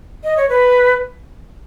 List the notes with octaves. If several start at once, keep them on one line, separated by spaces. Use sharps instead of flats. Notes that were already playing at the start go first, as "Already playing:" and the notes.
D#5
C#5
B4